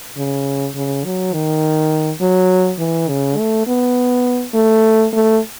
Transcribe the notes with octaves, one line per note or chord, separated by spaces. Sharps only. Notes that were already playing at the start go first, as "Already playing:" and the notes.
C#3
C#3
F#3
D#3
F#3
E3
C#3
A3
B3
A3
A3